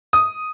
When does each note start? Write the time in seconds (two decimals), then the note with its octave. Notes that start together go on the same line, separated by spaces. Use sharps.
0.13 D#6